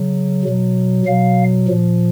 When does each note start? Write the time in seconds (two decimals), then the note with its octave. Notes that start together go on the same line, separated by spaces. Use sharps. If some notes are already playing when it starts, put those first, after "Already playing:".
Already playing: C#3 F#3
0.44 B2 F#3
1.06 B2 F#3 F5
1.68 A#2 F3